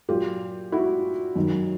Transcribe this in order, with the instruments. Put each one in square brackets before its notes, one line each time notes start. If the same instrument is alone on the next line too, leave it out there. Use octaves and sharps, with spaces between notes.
[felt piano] A#2 F#3 F4 G4
E4 F#4
F#2 D#3 F#3